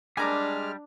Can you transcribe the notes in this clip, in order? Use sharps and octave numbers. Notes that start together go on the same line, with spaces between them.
G3 G#3 D4 G#5 A#5 D6 F6